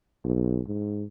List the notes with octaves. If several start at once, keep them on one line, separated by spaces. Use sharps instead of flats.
B1
G#2